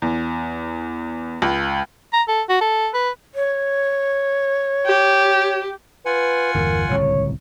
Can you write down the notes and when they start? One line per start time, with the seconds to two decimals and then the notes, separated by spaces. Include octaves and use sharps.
0.02 E2
1.42 C#2
2.13 A#5
2.28 A4
2.49 F#4
2.61 A4
2.94 B4
3.35 C#5
4.86 G4
6.06 F4 B4 F#5 G#5
6.54 G1 E2 A#4
6.90 D1 C2 C#3 C#5